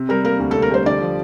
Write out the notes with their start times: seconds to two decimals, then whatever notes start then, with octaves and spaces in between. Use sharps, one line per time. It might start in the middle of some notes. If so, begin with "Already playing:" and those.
Already playing: C3
0.09 G3 A#4
0.25 A#3 A#4
0.39 D2
0.51 A4
0.55 C3
0.62 A#4
0.71 G3 C5
0.86 D3 D5
1.01 F3